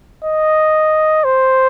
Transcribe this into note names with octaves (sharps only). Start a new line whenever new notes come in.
D#5
C5